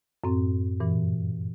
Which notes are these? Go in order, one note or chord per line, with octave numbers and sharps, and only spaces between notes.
F#2 A2 C4
G2 A#2 E3